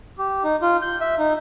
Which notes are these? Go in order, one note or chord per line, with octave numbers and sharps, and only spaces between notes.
G4
D#4
F4
G6
E5
D#4